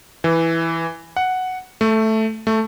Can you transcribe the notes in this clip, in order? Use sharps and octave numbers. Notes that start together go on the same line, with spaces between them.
E3
F#5
A3
A3